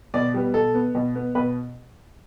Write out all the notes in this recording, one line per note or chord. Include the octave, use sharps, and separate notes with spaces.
B2 D5
G3 B3
B2 A4
B3
B2
B3
B2 B4